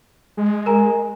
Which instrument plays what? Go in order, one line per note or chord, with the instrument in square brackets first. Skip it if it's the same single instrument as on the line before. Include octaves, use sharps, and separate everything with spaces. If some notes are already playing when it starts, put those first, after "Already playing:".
[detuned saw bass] G#3
[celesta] A#4 G#5 A#5